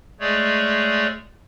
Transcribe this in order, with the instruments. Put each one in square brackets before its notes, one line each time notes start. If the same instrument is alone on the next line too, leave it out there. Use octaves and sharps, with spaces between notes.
[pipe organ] G#3 A3 G#4 C#5 D5